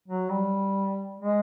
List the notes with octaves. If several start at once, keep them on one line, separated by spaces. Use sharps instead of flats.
F#3
G3
G#3